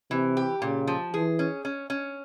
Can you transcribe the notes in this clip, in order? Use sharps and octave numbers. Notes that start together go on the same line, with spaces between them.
C3 E3
G4
A#2 C#3
F3
E3 G#4
C#4
C#4
C#4